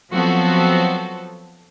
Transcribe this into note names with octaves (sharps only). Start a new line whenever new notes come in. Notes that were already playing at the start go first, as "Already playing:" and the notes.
F3 F#3 B3 C4 F#4 A4